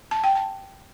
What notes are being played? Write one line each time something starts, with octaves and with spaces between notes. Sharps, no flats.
A5
G5
A5